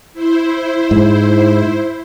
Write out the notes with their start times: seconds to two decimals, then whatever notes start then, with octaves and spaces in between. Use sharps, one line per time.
0.13 E4 C5
0.91 G#2